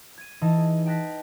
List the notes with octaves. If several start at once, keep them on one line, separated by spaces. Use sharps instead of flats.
G#6 D#7
E3 D#4 D#5 A5
G#4
D#5 G5 A5 F#6 A#6 B6